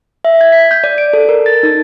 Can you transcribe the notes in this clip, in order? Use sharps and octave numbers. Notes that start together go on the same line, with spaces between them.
E5
G#6
B6
G6
D5
D7
A4
A#4
A6
D#4